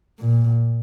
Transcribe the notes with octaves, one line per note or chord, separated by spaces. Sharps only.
A#2